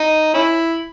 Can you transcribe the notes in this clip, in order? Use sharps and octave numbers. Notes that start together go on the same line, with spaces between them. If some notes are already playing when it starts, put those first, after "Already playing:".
Already playing: D#4
C#4 E4